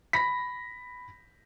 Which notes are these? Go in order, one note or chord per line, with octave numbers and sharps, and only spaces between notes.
B5 A#6 B6